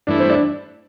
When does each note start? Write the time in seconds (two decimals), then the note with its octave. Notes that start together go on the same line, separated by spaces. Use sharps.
0.07 G2 E3 A3 D4 E4
0.19 C4
0.30 D4